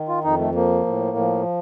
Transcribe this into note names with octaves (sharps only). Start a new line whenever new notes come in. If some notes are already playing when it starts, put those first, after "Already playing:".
Already playing: D#3
F4
F2 D#4
A3
F3 A#3
A2
F3